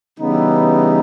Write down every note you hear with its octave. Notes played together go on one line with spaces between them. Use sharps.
C#3 E3 G3 B3 D#4